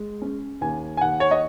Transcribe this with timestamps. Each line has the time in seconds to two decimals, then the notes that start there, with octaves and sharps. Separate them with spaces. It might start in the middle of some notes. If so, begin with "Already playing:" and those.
Already playing: G#3
0.22 C#4
0.61 D#2 G#5
0.97 G#5
1.01 D#2 F#5
1.20 C#5
1.31 D#5